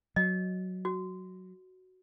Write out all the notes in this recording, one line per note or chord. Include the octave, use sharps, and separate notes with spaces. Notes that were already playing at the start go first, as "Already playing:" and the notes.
F#3 D#5
F#4